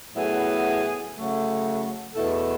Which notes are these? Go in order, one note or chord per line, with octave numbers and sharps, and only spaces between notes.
A2 F#3 B3 E4 G#4
C#3 F#3 A3
E2 B2 A3 E4 A4